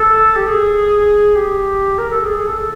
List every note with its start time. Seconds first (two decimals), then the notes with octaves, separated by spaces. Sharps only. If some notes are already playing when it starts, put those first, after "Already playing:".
Already playing: A4
0.36 G4
0.47 G#4
1.35 G4
1.98 A#4
2.11 A4
2.24 G#4
2.37 G#4
2.47 A4